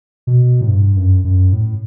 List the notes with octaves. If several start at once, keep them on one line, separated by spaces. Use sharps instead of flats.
B2
A2
G2
F#2
F#2
A2